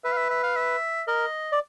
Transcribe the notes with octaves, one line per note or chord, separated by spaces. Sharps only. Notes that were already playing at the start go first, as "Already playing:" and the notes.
B4 E5
F5
E5
E5
F5
E5
A#4 D#5
D5